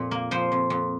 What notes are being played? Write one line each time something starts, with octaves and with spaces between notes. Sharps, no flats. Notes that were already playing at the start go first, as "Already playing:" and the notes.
Already playing: F2 A#2
A#3
F3 C5
F2
F2